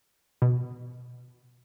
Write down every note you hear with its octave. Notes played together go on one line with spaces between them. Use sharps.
B2